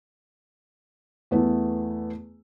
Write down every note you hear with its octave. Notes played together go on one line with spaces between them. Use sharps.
E2 A3 B3 E4